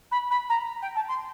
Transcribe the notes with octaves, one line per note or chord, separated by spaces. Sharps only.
B5
B5
A#5
G5
A5
C6